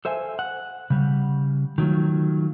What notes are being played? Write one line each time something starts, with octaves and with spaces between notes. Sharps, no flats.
A4 C5 E5 F5 G#5
F#5
C#3 G3
D#3 F#3 A3 F4